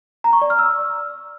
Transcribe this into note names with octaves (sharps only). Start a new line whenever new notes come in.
A#5
C#6
D5
F6
E6